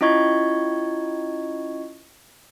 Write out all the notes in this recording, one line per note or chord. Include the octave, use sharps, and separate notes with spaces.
C#4 E4 F4 D#5 C#6 G#6